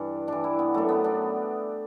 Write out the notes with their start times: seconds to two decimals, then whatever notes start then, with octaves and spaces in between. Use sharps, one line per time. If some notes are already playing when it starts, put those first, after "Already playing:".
Already playing: G2 E3 D4
0.28 G2 E3 D4
0.44 E4
0.59 B3
0.74 F#2 F#3 A3
0.89 B3
1.04 D4